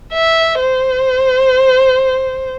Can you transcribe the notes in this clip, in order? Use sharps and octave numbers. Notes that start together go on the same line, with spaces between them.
E5
C5